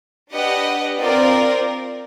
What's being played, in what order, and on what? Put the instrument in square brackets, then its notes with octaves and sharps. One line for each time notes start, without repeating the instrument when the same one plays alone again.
[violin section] D4 G4 B4 D#5 F#5
C4 F4 A#4 D5